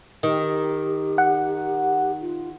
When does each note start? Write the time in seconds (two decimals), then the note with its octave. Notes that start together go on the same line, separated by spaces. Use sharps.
0.23 D#3 G4
1.18 F#5
2.21 F4